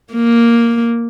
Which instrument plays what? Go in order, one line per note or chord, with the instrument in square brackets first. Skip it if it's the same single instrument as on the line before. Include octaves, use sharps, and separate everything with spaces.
[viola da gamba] A#3